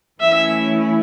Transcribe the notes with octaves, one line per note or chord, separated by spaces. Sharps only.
E3 A3 C#4 E4 E5